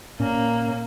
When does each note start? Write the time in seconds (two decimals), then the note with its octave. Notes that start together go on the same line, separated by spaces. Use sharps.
0.20 A#2 A#3 C#4